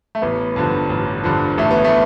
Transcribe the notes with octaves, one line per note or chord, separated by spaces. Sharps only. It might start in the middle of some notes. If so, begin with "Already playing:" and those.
A3
A1 B3
G2 D3 F3
A1
G2 D3 F3
A1 A3
B3
A3